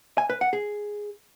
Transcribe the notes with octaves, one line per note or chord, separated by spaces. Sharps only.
G#5
B4
F#5
G#4